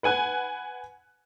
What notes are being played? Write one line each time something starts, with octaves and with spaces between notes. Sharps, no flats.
B4 F#5 G#5 F#6